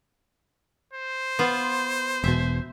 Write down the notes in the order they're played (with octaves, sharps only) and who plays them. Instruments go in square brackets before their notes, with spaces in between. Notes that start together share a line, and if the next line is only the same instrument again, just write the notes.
[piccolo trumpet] C5
[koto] B3 F4
[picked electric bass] E1 B2 [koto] E5